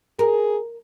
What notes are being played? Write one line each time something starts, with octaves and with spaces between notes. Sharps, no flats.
G#4 A#4